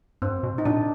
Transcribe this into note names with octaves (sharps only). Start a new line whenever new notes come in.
G2 C4
B2
D#4
A#2 D4